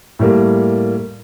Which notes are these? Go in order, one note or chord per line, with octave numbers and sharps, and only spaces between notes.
A2 G3 A#3